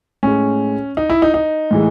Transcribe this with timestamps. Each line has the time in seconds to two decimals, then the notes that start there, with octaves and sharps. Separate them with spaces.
0.23 A2 G#3 C#4
0.97 D#4
1.10 E4
1.22 D#4
1.34 D#4
1.71 A2 E3 G#3